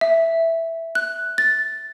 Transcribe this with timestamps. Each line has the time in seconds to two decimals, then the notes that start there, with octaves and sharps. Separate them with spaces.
0.01 E5
0.95 F#6
1.38 A6